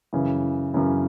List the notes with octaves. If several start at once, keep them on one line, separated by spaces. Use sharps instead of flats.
F#2 C#3 E3
F#2 C#3 E3